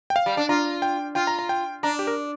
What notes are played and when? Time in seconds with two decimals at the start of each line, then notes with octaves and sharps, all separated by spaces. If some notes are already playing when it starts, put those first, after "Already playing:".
0.10 G5
0.16 F5
0.26 G3
0.37 D4
0.49 F4 A#5
0.82 G5
1.15 F4 G5
1.27 A#5
1.39 A#5
1.49 G5
1.83 D4 A#5
1.99 G4
2.07 A#4